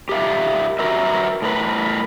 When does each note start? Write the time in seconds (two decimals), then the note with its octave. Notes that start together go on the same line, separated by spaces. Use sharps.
0.09 G4 A#4 E5 F5
0.79 F#4 A#4 B4 E5
1.42 A2 A#4 B4